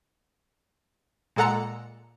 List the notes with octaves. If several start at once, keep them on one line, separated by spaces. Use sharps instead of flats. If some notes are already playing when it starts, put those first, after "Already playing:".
A#2 G#3 A4 F#5 A#5 C#7